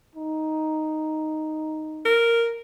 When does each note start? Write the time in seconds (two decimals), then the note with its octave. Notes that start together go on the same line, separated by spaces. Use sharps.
0.16 D#4
2.06 A#4